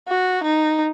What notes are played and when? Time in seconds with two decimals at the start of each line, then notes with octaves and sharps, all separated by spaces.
0.08 F#4
0.44 D#4